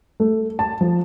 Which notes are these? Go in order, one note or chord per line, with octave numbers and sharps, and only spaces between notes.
A3
A5
F3